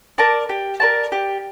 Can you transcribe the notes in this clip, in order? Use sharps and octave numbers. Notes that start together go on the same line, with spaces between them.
A#4 D5 A5
G4
A#4 D5 A5
G4